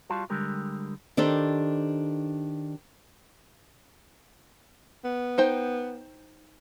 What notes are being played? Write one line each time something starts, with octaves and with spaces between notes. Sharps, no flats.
G3 F4 F#4 F5 A5
D3 G3 G#3 G4 A#4
D#3 D4 G4 A4 C5
B3
D#4 C5 G5